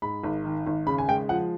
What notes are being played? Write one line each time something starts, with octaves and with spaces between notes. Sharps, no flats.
G#2 B5
G#1
D#3
G#1
C#3 B5
G#5
G#3 G5
F3 F#5